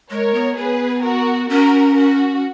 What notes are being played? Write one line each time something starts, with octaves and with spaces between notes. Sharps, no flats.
G#3 A#4 C#5
B3
B3 G#4 B4
F#4 A#4
C#4 F#4 A#4
F#4